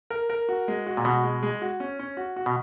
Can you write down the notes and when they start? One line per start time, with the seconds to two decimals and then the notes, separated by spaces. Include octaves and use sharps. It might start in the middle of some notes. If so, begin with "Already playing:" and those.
0.10 A#4
0.30 A#4
0.49 F#4
0.68 G#3
0.87 F#4
0.97 A#2
1.04 B2 F#4
1.23 G#3
1.43 G#3
1.62 F#4
1.80 C#4
1.99 C#4
2.17 F#4
2.36 F#4
2.46 B2